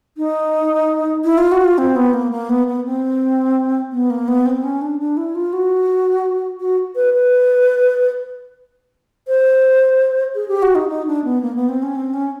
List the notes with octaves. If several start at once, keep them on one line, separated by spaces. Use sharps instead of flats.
D#4
E4
F4
F#4
F4
C4
B3
A#3
A#3
B3
B3
C4
B3
A#3
B3
C4
C#4
D4
D4
E4
F4
F#4
F#4
B4
B4
C5
G#4
G4
F#4
D#4
D#4
D4
B3
A#3
B3
C4
C#4
C4
C#4